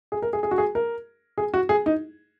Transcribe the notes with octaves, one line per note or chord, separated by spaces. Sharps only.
G#4
A#4
G#4
G#4
F#4
G#4
A#4
G#4
F#4
G#4
D#4